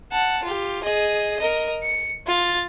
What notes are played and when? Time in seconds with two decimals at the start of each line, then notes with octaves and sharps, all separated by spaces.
0.12 F#5 A5
0.44 F4 G4
0.83 G#4 D#5
1.39 A#4 D#5
1.83 C#7
2.27 F4 A6